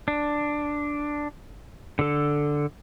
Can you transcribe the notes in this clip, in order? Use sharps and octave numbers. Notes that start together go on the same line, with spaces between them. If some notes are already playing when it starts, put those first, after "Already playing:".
D4
D3 A4